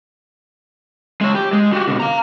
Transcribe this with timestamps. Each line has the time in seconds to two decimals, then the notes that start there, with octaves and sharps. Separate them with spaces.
1.21 G#3 C#5
1.35 G4
1.53 G#3
1.72 F#4 G4
1.88 B2 D3
2.00 F5 A#5